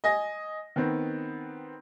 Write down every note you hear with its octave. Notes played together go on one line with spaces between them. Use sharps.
D#5 G#5 A#6
D#3 B3 C4